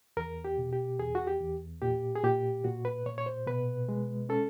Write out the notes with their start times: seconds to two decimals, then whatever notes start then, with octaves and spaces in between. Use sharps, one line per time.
0.17 E2 A#4
0.45 G4
0.58 B2
0.73 G4
0.99 E2 G#4
1.15 F#4
1.27 G4
1.41 E2
1.82 A#2 G4
2.15 G#4
2.24 A#2 G4
2.64 A#2 F#4
2.85 B4
3.06 A#2 C#5
3.18 C#5
3.26 C5
3.47 B2 B4
3.89 G#3
4.29 C#4 A4